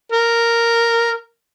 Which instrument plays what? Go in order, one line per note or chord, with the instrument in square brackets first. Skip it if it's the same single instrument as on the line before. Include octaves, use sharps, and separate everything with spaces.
[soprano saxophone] A#4